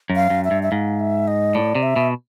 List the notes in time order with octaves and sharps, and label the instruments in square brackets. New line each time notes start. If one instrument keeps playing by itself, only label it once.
[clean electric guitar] F#2
[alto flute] F5
[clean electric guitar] F#2
[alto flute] E5
[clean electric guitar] G2
[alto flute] E5
[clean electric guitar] G#2 [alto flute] F5
[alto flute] E5
D#5
[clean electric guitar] A2 [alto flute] D5
[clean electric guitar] C3
[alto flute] E5
[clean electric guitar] B2